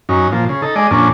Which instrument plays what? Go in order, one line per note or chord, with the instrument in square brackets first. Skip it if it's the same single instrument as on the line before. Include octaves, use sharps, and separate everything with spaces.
[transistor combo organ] F#2 C#4 D#4
A#2 F3
C#3
D#4 A4
G#3 D5 D#5
F2 A#2 C#4 D4